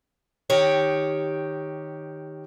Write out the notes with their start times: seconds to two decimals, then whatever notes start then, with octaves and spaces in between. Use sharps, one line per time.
0.50 D#3 G4 C#5